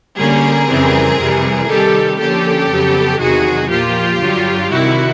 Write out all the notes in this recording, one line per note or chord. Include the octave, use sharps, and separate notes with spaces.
D3 G3 A#3 C#4 G#4 A#4
F2 C#3 E3 G3 C4
F2 C3 E3 G3
C3 D#3 G3 G4 A4
D3 F3 A#3 C#4 G4 A4
F2 C#3 F#3 B3
E2 C3 D#3 F#3 F#4 G#4
A#2 F3 A#3 F4 G4
G2 D3 F#3
C3 D#3 G3 E4 F#4